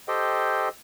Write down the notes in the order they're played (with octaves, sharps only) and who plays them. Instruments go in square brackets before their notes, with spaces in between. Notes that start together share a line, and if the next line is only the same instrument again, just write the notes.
[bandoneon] G4 A4 C5 D#5 G5